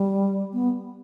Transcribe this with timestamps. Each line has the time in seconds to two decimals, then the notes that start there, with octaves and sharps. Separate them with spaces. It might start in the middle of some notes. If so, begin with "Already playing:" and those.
Already playing: G3
0.53 B3